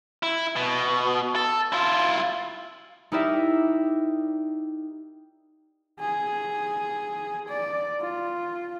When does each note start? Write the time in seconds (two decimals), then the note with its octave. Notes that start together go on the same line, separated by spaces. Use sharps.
0.23 E4
0.56 B2
1.36 A4
1.72 E4 F4
3.12 D#4 E4 G4 A#4 D5 E5
6.00 G#4
7.49 D5
8.01 F4